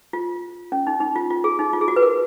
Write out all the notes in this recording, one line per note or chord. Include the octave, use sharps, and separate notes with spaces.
F4
C#4
D#4
D#4
F4
F4
G#4
D#4
F4
G#4
F#4
B4
A#4